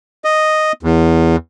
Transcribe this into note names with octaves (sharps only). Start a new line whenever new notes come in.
D#5
E2